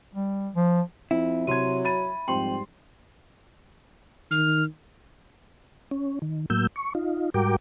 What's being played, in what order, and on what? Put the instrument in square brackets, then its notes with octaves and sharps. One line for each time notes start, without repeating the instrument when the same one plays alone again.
[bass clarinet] G3
F3
[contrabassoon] F2 [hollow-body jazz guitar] E4
[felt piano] C3 G#6 [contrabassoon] F#3 [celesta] C6 D#7
[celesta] B5 [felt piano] A6 D#7
[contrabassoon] F2 [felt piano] G#2 G3 C6 [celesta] G5 F#7
[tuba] D#3 [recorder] F6
[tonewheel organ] C#4
D#3
A2 F#3 A#3 E6 G6
C#6
D#4 F4
G#2 G3 F#4 A#4 G5 D6